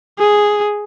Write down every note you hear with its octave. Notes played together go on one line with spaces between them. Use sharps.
G#4